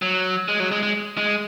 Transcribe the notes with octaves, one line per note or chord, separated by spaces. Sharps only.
F#3
G#3
F#3
G#3
G#3
G#3